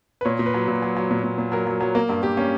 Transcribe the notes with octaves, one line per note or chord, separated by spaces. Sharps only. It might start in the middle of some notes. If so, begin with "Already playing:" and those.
B4
A#2 C#5
A#2
B4
F#3
A#2
F#3
F#3
A#2
A#2
A#2
F#3 A#4
F#3
F#3
A#3 A#4
G2
A#3 G4
A#3 C#4